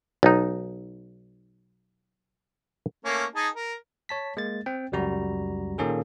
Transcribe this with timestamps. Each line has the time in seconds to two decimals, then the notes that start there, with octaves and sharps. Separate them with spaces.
0.23 B1 D#4
3.05 A3 A#3 C#4
3.35 D#4 G#4 A5
3.56 A#4
4.09 C#5 A5 B6
4.37 G#3 A#3 A6
4.66 C4 G5
4.92 C#2 F#2 G3 F#4 A#5
5.78 A#2 D#3 A#3 C#4 G#4 A4